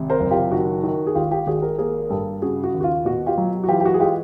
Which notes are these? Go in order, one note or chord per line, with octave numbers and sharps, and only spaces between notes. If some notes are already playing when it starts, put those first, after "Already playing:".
Already playing: G#1 C3
A#4 C5
F#1
F4 G4
D#3 F#4
D#3
G#4
G#1 F4 G4
F4 G4
G#1 F#4 G#4
G#4 A#4
A#3 G#4 A#4
G2 G4 A4
C#3 F#4 G#4
F#4
D#2
F#4
F4
B2 F#4
F4 G4
F#3
F#4
E3 F4 G4
G4
F#4
G#4
G#3 F4 G4